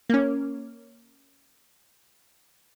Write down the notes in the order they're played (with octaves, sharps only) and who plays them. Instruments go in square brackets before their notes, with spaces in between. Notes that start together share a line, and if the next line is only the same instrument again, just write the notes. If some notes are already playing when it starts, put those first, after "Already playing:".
[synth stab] A#3 C#4